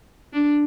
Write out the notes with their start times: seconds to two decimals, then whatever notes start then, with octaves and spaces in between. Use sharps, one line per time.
0.33 D4